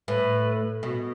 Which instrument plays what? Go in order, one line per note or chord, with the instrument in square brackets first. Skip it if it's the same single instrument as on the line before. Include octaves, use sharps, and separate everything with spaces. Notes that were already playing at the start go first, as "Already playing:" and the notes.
[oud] A2 [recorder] B4
[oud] B2